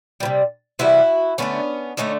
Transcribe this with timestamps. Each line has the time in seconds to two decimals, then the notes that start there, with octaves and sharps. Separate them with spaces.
0.20 E3 G3
0.25 C3
0.79 C3 E3 G3 E4 F#4
1.38 D3 F#3 A3 B3 C#4
1.97 D3 F#3 A3 C#4 D#4